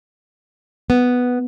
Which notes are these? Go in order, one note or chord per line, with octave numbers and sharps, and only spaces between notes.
B3